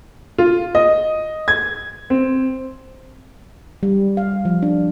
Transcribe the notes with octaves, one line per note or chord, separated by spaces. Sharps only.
F4
D#5
G#6
C4
G3
F5
F3
D4